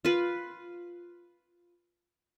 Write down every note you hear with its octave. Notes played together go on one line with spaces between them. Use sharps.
F4 B4